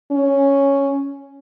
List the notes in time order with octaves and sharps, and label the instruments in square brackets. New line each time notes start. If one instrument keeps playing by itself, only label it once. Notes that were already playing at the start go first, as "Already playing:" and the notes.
[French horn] C#4